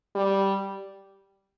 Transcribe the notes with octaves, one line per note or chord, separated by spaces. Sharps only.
G3